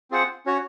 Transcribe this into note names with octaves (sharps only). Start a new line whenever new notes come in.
C4 F4 G#4 C5 F#5
C#4 F#4 C#5